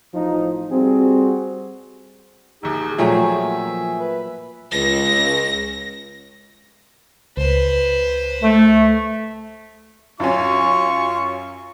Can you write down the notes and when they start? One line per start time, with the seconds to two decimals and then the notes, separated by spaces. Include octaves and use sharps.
0.14 A1 F3 D#4
0.71 G3 C4 F#4 G#4
2.63 A#1 D#2 D#4 G#4
2.98 A#2 F3 F#3 A3 G#4 E5 G5 G#5
4.00 B4
4.72 C#2 A#6
7.37 C#2 B4 C5
8.43 A3
10.20 F#2 C#4 F4 C#6